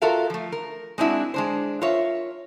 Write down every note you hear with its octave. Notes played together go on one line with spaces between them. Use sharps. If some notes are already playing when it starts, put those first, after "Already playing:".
F4 F#4 A4 A#4 E5 F5
F3 A3
A#4
G#3 C4 D4 E4 F#4
G#3 D4 C5
F4 A#4 C#5 E5